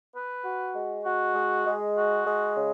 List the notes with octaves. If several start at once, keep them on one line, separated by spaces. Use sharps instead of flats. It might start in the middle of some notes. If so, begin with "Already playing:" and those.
B4
F#4
G#3
F#4
G#3
G#3
F#4
G#3
C#3